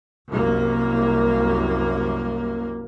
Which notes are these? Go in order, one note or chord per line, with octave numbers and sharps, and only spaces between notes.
C2 F#2 A#3